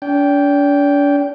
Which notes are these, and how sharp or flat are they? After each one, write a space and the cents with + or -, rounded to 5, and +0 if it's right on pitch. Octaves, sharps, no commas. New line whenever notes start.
D4 -40 G5 +0